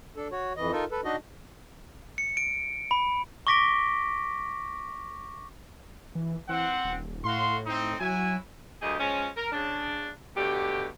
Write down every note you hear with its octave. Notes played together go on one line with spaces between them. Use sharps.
D4 A4
F#4 C#5
F2 E3 D#5
D#4 F4 A4 A#4
A4 B4
D4 D#4 F#4 D#5
C#7
D7
B5
C#6 D6 A#6 B6 D7 G7
E3
E3 C4 F#5
D#1
A2 F#4 F5 C6
C4 D#4
F#3 E4 F#4 G#5
D2 G2 G4 G#4 D#5
F3 G#3 C#4
A#4
C#3 D4
B2 D3 A3 G4